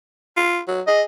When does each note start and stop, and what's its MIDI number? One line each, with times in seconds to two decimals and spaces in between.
0.37 0.59 65
0.68 0.81 54
0.88 1.04 68
0.88 1.02 75